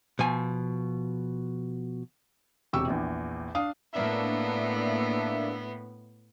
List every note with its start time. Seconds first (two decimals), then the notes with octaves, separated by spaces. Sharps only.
0.19 B2 F3 G#5
2.73 E1 C3 G4 C#6 E6
2.88 A#1 E2
3.55 D4 F5 D#6
3.93 A2 A#3 B3 D4 E5